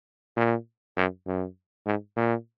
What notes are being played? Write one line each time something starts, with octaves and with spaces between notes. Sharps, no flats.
A#2
F#2
F#2
G#2
A#2